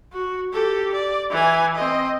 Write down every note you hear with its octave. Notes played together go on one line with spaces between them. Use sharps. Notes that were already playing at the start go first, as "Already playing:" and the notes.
F#4
G4 A4
D5
E3 G#5
C4 D#5